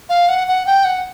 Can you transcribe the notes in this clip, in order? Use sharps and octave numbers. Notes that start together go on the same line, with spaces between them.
F5
F#5
F#5
G5
F#5